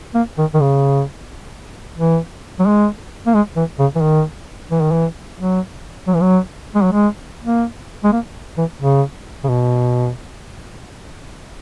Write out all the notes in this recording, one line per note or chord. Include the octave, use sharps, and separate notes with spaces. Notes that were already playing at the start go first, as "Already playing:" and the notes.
A#3
D#3
D#3
C#3
E3
F#3
G#3
A#3
G#3
E3
C#3
E3
D#3
E3
D#3
E3
F#3
F#3
E3
F#3
G#3
F#3
G#3
A#3
G#3
A#3
E3
C#3
C#3
B2